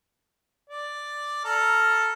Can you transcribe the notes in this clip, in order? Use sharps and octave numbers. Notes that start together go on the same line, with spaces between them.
D5
A4 A#5 F6